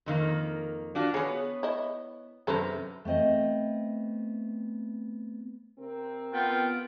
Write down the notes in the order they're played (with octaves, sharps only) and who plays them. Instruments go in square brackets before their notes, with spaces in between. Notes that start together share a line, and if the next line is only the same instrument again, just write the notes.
[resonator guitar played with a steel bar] F2 D#3 A#3
D4 F4 F#4
[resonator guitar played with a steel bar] B3 C#5 [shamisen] G#4
[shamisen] E4 D#5
[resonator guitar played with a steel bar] F#2 C3 A#5 [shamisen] A4 B4 C5
[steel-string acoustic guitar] A3 B3 C4 D#5
[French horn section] C3 C4 A#4
[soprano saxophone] B3 [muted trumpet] F4 [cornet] G5